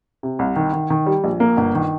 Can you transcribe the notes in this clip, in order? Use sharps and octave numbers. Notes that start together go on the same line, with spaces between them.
C3
C2
D#3
D#3
D#3
G3
A#1
A#3
G1
D#3